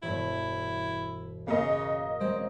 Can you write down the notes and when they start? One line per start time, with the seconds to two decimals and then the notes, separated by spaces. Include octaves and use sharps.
0.03 E1 G2 E3 E4
1.47 C#3 A#3 D#5
2.20 G3 G#3 C4 C#4